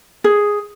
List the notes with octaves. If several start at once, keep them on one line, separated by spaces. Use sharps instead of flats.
G#4